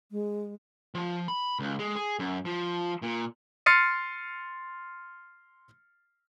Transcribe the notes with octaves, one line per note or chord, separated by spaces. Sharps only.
G#3
F3
B5
C#2
G#3
G#4
F#2
F3
A#2
C6 F6 A6 C7 C#7 D#7